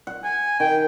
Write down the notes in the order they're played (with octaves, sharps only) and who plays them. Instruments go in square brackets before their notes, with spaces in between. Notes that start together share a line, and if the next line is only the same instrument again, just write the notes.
[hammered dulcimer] F#5
[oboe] G#5
[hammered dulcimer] D#3 [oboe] G5